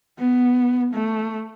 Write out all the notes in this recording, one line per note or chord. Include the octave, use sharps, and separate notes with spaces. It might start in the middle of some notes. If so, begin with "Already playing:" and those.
B3
A3